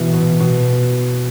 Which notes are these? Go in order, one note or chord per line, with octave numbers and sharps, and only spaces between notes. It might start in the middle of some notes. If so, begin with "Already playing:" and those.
Already playing: B2 E3 E4
B2
B2